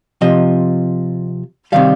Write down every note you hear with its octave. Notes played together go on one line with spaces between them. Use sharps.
C3 F3 D#5
C3 D#3 G3 F5